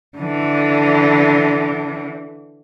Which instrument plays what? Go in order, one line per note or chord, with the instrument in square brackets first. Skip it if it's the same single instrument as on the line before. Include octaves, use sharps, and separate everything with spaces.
[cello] D3 E3